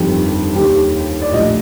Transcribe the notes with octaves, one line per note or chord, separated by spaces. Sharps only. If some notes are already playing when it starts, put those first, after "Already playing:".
Already playing: G1 F2 D#3 G4
D#2 D#3 G4
D5
A#1 A2 F3 D#5